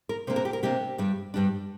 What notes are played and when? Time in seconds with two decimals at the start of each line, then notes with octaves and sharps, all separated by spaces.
0.09 A#4
0.27 C3 A#3 D4 C5
0.36 A#4
0.45 G4
0.53 A#4
0.63 C3 A#3 D4 G4
0.98 G2 G3 D4
1.34 G2 G3 D4